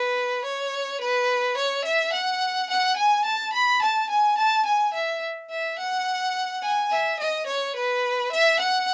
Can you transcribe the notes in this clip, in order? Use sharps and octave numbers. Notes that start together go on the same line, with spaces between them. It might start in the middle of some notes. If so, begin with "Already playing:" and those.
Already playing: B4
C#5
B4
C#5
E5
F#5
F#5
G#5
A5
B5
A5
G#5
A5
G#5
E5
E5
F#5
G#5
E5
D#5
C#5
B4
E5
F#5